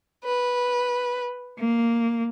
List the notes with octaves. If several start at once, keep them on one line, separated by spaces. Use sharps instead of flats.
B4
A#3